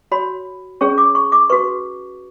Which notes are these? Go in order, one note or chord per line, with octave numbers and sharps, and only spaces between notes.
F#4 C#5 B5
C#4 G#4 C#5 C#6
D6
C#6
D6
F#4 B4 C#6